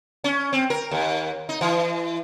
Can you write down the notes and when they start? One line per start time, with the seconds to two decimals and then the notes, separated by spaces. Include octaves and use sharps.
0.24 C#4
0.53 C4
0.70 A#4
0.91 D#2
1.49 D#4
1.61 E3